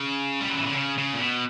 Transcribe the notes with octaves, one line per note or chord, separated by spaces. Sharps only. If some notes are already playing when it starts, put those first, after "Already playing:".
Already playing: C#3
G3
F#3
E3
D3
C#3
C#3
A#2
B2